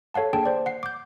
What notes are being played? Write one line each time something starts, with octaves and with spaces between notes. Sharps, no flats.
A4 C#5 F5 F#5 A5
A#3 D4 G#4 G5 A5
C5 D5
F#5 C7
D6 G6